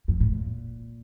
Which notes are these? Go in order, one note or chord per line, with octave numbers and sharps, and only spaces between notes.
F2
A2
A#2